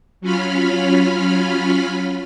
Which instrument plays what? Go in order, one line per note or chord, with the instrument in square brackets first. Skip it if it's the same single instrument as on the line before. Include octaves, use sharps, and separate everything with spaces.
[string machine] F#3 C#4 F4 B5 F6